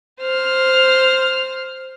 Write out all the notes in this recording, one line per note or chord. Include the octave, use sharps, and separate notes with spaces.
C5 F6